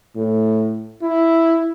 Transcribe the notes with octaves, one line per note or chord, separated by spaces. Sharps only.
A2
E4